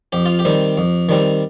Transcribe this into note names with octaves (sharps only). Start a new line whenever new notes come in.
F2 G4
F4
G4
D#3 G3 C4
F2
D#3 G3 C4